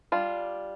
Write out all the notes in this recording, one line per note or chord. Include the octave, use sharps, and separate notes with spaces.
G3 D4 F4